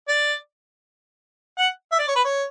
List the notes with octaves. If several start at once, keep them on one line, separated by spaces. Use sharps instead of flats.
D5
F#5
E5
D5
C#5
B4
C#5